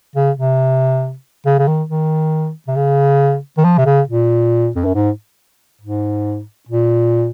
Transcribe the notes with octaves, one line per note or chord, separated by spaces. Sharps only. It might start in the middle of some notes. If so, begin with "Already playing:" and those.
C#3
C3
C#3
C#3
D#3
D#3
C3
C#3
D#3
F3
C3
C#3
A#2
F2
F#2
G#2
G#2
A#2